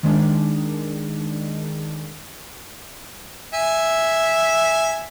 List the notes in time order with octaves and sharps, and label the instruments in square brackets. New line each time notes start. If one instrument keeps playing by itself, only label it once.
[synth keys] D#3 G#3 D4
[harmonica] E5 G#5